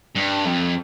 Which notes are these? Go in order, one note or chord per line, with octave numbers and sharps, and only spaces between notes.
G2
F2